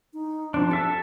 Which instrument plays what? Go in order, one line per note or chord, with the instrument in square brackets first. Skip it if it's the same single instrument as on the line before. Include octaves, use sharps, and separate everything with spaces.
[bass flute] D#4
[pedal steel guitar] F3 D4 [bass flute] C4
[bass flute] G4 [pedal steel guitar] A4 E5 A5